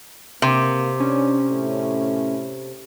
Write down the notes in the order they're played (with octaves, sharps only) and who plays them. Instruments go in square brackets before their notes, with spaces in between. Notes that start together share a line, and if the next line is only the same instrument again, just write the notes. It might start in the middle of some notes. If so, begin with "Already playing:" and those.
[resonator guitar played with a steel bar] C3 [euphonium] A#3
[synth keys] C#4 [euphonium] D4
[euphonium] A2